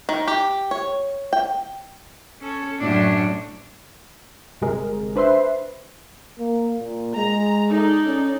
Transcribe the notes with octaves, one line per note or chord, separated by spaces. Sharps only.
D#3
G4
C#5
G5
C#4 A4
F#2 A2 D4
G1 C3 G#3 A#4
D4 B4 C5 E5 C6
A#3
A#2
G#3 A#5
D#4 A4 D5
C#4